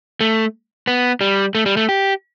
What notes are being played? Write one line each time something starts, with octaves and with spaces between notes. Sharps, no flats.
A3
B3
G3
A3
G3
A3
G4